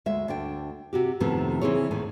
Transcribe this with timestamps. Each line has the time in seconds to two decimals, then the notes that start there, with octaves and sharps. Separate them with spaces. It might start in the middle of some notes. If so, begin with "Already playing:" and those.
0.06 D2 G#3 E5
0.28 D2 D4 G5
0.93 C3 F#4 G4
1.20 F2 A2 C3 D#3 F3 B3
1.61 C#3 E3 C4 E4 G#4 C#5
1.91 D2 A2 D#3 G#5